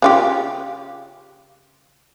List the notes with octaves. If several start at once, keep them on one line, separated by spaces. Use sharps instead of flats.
C#3 F4 G4